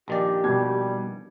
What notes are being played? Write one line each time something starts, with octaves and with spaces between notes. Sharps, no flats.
A#1 D#3 G4 D5
B2 G3 G#6